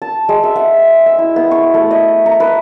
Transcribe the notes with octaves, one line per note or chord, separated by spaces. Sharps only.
A5
G#3
E5
F#5
E5
E4
B3
C#6
A3
D#5
A#5
B4